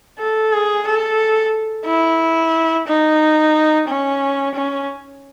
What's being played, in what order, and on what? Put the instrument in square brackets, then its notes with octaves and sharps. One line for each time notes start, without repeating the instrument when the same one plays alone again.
[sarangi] A4
G#4
A4
E4
D#4
C#4
C#4